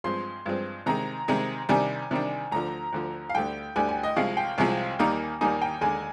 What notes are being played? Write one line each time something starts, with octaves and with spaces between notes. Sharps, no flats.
G2 F3 G#3 C4 C6
G2 F3 G#3 C4
C3 D#3 G#3 C4 A#5
C3 D#3 G#3 C4
C3 D#3 G3 D4 G#5
C3 D#3 G3 D4
D2 D3 F3 A#5
D2 D3 F3
F5
D2 D3 G3 G5
D2 D3 G3 G#5
G#5
D#5
C2 C3 F3 G#3 F5
G5
C2 C3 F3 G#3 G#5
D#2 D#3 G3 A#3 D#4
D#2 D#3 G3 A#3 D#4 G#5
G5
D#2 D3 G#3 D4 G#5